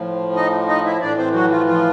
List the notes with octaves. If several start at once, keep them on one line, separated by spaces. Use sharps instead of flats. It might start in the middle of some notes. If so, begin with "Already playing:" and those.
Already playing: A2 F3
D#4 D#5
D#4 D#5
E4 E5
A2 E3 D4 D5
C4 C5
F#3 F#4
F3 F4
F3 F4